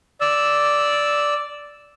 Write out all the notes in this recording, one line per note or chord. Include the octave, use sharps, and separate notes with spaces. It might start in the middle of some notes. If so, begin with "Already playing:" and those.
D5 E6